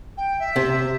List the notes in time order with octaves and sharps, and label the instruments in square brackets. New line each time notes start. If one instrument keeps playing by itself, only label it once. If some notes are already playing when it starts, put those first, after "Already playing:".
[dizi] G5
E5
[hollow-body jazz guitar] C3